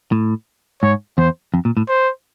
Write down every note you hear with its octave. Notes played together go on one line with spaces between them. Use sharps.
A2
G#2 C#5
E2 C5
F2
A#2
A2
C5